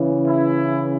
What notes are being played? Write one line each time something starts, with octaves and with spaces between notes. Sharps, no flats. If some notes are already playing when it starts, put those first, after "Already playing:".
Already playing: C#3 E3
E4